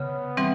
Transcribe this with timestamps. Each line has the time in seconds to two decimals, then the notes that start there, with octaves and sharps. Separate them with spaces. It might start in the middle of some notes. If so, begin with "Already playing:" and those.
Already playing: C#3 B3
0.37 E3 G3 C4